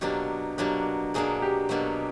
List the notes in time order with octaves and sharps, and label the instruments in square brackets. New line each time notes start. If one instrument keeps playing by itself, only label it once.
[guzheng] B2 F#3 A#3 D4 [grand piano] G4
[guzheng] B2 F#3 A#3 D4 [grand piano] G4
[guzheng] B2 F#3 A#3 D4 [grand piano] G#4
[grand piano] G4
[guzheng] B2 F#3 A#3 D4